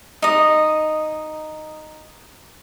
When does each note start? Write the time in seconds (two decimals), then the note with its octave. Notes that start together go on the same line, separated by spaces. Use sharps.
0.22 D#4 D#5